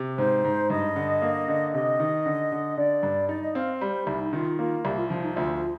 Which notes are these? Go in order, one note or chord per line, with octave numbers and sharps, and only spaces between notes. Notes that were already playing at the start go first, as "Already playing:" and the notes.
Already playing: C3
G#2 C5
G#2
G2 D#5
D3
A#3
D3
C3 D#5
D#3
D3
D3
D3 D5
G2
D#4 D5
D#5
C4 F5
G3 C5
C2 D#4
D#3 F4
A#3 F4
C2 G4
F4
F3 F4
D#4
D2 F4
F4